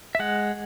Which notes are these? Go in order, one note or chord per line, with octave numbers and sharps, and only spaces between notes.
E5
G#3 F#5